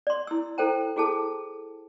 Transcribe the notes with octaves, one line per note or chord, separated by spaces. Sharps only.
D5 C6
E4 E6
E4 A4 C5 G5 A#5
E4 F#4 G#4 A4 A5